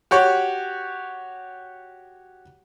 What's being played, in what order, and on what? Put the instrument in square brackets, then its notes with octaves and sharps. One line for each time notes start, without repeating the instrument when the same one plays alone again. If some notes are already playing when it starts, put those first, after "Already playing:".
[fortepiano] F#4 G4 C#5